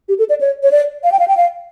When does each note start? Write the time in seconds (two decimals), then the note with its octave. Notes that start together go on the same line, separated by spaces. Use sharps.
0.09 G4
0.19 A4
0.29 D5
0.41 C#5
0.63 C#5
0.71 D5
1.04 F5
1.12 G5
1.19 F5
1.28 G5
1.37 F5